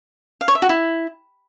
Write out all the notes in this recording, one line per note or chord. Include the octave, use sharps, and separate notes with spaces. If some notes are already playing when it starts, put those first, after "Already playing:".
F5
C#5
E5
F#4
E4